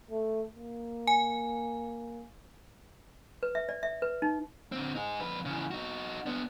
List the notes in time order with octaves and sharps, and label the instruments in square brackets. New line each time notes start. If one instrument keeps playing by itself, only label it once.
[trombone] A3
A#3
[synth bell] G#5
[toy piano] B4
E5
D5
E5
B4
D#4
[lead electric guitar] D3 C4
D#4 G#4
F2 B4
C#3 E3
D#4 F#4
B3 D4